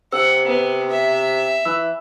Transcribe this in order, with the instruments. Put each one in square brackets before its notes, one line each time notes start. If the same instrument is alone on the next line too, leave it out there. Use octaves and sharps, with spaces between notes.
[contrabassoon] C3 [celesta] C5 E6 [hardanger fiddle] F#5
[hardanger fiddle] B3
E5
[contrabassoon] E3 [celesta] E6